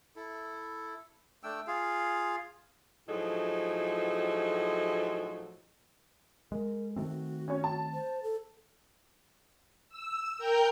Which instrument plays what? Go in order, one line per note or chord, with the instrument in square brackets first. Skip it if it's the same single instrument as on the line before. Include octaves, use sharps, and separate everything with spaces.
[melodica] E4 A4
A3 D4 G5 E6
F4 G#4 F5
[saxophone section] A2 F3 F#3 D#4 G#4 A4
[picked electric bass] G#3 [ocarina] A#4
[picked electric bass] D#3 A3 C4 [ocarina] F#4
[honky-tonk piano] C#4 C#5
A5
[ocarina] C5
A4
[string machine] E6
A#4 G5 G6